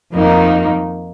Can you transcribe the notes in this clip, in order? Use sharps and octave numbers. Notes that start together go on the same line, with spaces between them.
F2 D#3 A#3 D#4